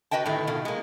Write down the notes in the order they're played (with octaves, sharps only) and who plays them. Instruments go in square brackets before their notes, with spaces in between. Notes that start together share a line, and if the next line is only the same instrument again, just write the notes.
[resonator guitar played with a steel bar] F#4 B4 D#5 G5 A5
A2 D3 D#3 A3
B2 D#3 F4
G#3 A#3